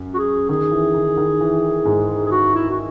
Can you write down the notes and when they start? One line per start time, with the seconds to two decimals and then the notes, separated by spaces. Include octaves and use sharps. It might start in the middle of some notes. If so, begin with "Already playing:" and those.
Already playing: F#2
0.14 F#4
0.18 G#4
0.49 D#3 G#4
0.71 E3
0.94 D#3
1.17 D#3
1.40 E3
1.85 G#2 G#3
2.26 G#4
2.32 F#4
2.55 E4
2.70 F#4